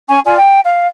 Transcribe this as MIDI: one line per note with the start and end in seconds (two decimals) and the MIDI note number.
0.08 0.19 61
0.08 0.19 80
0.08 0.19 85
0.25 0.37 65
0.25 0.37 74
0.25 0.37 80
0.38 0.61 79
0.64 0.87 77